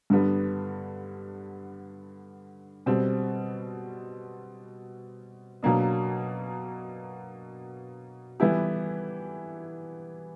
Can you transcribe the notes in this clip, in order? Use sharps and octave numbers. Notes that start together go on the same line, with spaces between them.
G2 D3 G3 B3
B2 G3 C4
B2 F#3 A#3 D4
E3 G3 B3 E4 G4